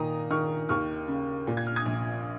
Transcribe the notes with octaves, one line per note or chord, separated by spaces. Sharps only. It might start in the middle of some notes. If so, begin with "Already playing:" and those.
Already playing: A#2 D#3 A#5 D#6
D#3 C#6 F6
D#2 C#6 F6
C#3
A#2
G#6
F6
D#6 G#6
A#1